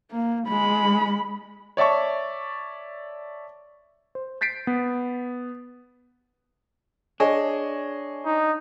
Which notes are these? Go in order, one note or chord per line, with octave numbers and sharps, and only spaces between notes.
A#3
G#3 B5
C#5 D5 E5 A5 C#6
C5
G6 A6 B6 C7 D7
B3
D4 G#4 C#5 D#5
D#4